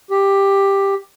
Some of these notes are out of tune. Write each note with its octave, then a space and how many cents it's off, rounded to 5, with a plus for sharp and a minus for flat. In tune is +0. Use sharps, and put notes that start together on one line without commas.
G4 +10